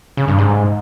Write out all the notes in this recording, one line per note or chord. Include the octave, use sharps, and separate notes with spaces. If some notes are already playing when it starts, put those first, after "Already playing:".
C#3
G2
G#2